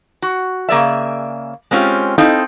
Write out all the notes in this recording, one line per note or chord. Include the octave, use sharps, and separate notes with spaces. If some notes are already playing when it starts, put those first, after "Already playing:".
F#4
C#3 A#3 G#4 D5 E5
G#3 C4 C#4 D#4 F4 G4
C4 D#4 E4 A4 D#5 F5